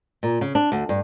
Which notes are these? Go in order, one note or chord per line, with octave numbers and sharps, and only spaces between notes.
A#2
C#3
D4
D2
G2